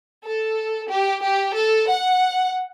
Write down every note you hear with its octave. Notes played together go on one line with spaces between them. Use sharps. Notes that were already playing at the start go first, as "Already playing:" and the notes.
A4
G4
G4
A4
F#5